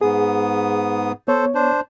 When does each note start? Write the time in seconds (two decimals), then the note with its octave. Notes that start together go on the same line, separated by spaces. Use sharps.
0.01 G#2 B3 G#4 D#6
1.28 B3 A4 C5 C#5
1.55 D4 C5